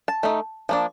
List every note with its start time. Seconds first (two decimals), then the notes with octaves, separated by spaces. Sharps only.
0.08 A5
0.23 A3 D#4
0.69 F3 A#3 D4